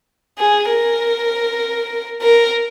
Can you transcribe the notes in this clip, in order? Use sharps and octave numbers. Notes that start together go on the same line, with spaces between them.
G#4
A#4
A#4